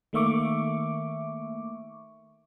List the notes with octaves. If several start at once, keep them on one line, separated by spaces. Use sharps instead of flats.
D#3 A3 A#3 E5 C#6 D6